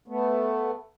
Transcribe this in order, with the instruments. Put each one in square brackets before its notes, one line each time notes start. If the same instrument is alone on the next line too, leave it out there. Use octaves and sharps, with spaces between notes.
[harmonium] A3 B3